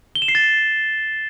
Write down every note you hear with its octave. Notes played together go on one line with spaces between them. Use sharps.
G7
E7
C7
A6